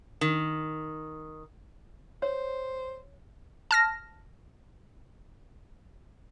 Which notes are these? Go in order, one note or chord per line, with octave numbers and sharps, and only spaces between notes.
D#3
C5 C#5
A5 F6 A#6